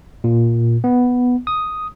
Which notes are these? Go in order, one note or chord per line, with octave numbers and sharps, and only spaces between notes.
A#2
B3
D#6